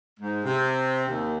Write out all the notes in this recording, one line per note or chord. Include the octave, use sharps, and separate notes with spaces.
G#2
C3
D#2